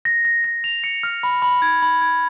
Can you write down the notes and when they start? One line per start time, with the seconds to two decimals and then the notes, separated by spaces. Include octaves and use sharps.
0.05 A#6
0.25 A#6
0.44 A#6
0.64 F7
0.84 C#7
1.03 F6
1.23 B5
1.42 B5
1.62 G#6
1.83 B5
2.01 G#6